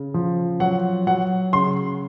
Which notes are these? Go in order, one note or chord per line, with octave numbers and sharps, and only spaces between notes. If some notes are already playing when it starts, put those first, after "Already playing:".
Already playing: C#3
F3
F#3 F#5
F#3 F#5
C#3 C6